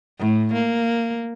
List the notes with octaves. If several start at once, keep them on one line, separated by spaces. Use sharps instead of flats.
A2
A#3